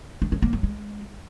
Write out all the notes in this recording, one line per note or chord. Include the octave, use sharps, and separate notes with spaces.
D4
C#4
A#3
F#3
G#3